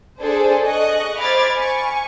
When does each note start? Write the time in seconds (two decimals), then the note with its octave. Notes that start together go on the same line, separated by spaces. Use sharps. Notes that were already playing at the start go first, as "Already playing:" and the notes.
0.18 D4 G#4 A4 C5
0.63 D#5 C#6 F#6
1.19 C5 B5 D6 F6 G#6 A6
1.57 G#5 C#6